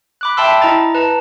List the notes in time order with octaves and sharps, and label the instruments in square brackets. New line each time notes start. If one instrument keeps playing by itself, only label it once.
[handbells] B5 D6 F#6
E5 G5 A5 B5 C6 E6
E4 D#5 A#5 A6
B4 A5 A#5